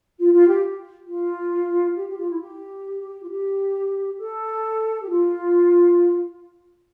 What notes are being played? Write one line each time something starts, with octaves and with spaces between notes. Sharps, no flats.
F4
F4
G4
F4
G4
G4
F4
E4
G4
F4
G4
A4
G4
F4